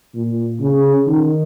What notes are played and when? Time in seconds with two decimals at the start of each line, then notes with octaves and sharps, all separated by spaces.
0.15 A#2
0.61 C#3
1.08 D#3